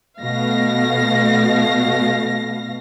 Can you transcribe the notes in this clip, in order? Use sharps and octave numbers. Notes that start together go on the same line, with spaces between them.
B2 A3 F5 A#6